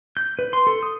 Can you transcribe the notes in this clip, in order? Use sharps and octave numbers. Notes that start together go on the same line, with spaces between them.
G6
B4
C6
A4
D#6